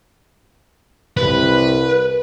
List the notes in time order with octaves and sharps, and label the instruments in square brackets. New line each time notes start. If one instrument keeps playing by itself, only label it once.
[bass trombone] C2 [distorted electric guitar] B4